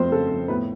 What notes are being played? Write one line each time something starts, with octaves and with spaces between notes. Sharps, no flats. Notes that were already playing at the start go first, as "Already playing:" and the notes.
Already playing: F2 A3 C4 C5
C#3 A4
F2
A2 B3 B4